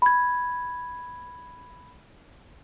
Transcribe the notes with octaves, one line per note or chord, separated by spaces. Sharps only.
B5 G#6